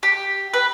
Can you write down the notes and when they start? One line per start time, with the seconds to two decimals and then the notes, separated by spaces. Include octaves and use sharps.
0.03 G4
0.54 B4